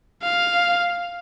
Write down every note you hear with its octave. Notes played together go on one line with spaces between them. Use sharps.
F5